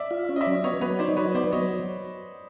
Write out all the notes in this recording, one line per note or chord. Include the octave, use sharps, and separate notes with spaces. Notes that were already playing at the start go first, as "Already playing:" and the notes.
Already playing: D5 E5
F4
C#4
D#5
D5 E5
F#3
B3 C#5 D#5
F#3 B4 C#5
D#4 C5 D5
F#3 B4 C#5
B3 C5 D5
F#3 C#5 D#5